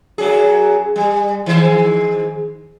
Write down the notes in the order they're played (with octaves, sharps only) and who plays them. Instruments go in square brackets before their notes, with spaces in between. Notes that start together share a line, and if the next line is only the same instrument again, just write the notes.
[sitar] F#2 F#3 G#4
G3
D#3 G#3 C5